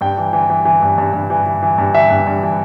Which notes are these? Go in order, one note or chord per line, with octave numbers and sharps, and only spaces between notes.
G2 G5
E3
E3
E3
E3
G2
G2
G2
E3
E3
E3
G2
E3 E5
G2
G2
E3